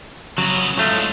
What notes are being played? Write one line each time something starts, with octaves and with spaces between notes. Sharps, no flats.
C#3 F#3 B3
A2 F#3 G#3 A3 F4